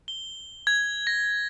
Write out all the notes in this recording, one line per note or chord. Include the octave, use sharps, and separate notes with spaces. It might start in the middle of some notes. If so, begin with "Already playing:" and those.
G7
G#6
A#6